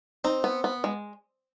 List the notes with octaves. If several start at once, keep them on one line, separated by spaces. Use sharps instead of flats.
C4 D#4
B3
B3
G#3